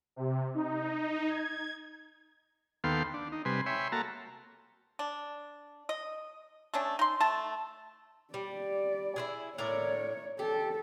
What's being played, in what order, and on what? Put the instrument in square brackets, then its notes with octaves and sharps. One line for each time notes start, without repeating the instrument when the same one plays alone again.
[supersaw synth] C3
D#4
G#6
[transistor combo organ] D#2 B3 A4 F5 G5 C6
D4
D#4
C3 G3 B4 G#5 C6
C#5 E5 G5 G#5 B5 C6
A#3 F#4 A4 A5 A#5
[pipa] D4
D#5
A3 C#4 D4
D#4 C6
A3 A5
[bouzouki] G3 [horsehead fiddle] D5
[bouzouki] E4 F4 G#4
[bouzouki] A2 A#4 D5 [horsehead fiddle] C#5
[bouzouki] G4 [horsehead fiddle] A4